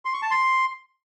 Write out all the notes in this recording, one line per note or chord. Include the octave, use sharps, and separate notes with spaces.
C6
C#6
A5
C6